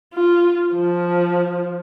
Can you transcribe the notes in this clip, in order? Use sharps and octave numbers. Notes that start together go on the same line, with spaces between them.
F4
F3